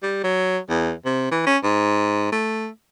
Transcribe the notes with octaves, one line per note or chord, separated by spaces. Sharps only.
G3
F#3
E2
C3
E3
C#4
G#2
A3